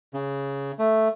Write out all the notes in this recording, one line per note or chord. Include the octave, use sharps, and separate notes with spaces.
C#3
A3